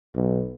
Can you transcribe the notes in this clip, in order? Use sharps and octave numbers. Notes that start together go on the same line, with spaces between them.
B1